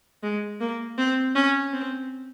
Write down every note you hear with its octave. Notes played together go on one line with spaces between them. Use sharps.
G#3
A#3
C4
C#4
C4